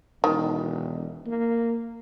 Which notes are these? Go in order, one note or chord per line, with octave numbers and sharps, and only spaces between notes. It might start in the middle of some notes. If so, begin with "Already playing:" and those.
E1 D#3
A#3